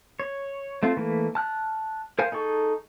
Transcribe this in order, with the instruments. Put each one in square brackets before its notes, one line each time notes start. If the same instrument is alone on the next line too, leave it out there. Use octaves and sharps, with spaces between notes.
[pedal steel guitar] C#5
A3 C4 F4
E3 A3 A#3
A5 F6 F#6
A#4 C5 F5 G#5
D#4 G#4 A4 C#6